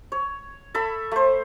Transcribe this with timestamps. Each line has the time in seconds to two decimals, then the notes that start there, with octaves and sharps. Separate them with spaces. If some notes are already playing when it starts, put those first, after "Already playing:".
0.12 C#5
0.74 A4 E5 B5
1.12 A3 C5